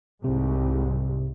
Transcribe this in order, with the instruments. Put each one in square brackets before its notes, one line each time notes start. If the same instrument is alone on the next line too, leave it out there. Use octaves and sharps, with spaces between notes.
[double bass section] C2 G#2 [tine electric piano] C3